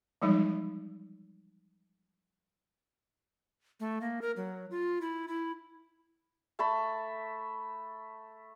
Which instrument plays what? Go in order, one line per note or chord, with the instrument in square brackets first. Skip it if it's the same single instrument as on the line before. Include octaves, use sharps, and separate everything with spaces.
[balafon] E3 F3 G3 G#3 D#4
[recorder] A3
A#3
A#4
F#3
F4
E4
E4
[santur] A3 A5 B5